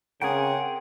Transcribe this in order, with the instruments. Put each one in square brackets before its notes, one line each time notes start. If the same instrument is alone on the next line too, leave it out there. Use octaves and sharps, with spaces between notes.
[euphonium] C#3 [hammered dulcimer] C4 C#4 A#4 [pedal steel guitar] G#4 G5 [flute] F#5